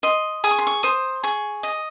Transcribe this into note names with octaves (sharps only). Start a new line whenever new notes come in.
D#5 C6
G#4 D#6
C#6
C6
C#6
C5 D#6
G#4 C#6
D#5